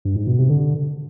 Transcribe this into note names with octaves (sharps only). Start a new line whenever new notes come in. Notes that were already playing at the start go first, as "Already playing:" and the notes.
G2
G#2
B2
C3
D3